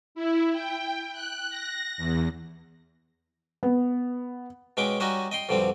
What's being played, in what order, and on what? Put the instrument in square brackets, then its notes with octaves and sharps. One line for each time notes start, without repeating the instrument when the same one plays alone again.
[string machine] E4
G5
F#6
A#6
E2
[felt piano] B3
[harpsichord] B2 G#3 C#4 G5 D6
G3 C#4 D#4 F#4 D#5
D#5 G5 C6
F2 B2 D3 G3 C4